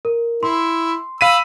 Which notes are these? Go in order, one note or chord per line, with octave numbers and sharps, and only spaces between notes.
A#4
E4 C6
F5 B5 E6 B6 D#7